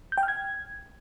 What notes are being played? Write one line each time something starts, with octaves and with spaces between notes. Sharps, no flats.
G6
G5
F6
G#6